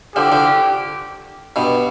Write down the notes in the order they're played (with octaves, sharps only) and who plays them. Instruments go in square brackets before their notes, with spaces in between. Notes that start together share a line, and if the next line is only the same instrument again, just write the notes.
[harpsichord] D3 F3 [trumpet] G4
[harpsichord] D3 F3
G2 B2